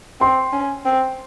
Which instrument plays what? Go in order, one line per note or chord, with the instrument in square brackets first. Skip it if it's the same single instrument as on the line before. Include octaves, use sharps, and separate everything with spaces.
[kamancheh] C4 [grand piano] C6
[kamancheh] C#4
C4